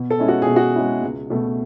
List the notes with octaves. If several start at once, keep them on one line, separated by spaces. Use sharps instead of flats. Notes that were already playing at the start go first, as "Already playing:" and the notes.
Already playing: B2
A4
G#3 C#4 E4
F#4
B2 G#4
F#4
G#3 C#4 E4
C#2
B2 A3